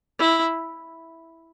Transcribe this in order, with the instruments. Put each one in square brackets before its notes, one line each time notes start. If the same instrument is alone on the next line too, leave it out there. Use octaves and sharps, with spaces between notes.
[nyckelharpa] E4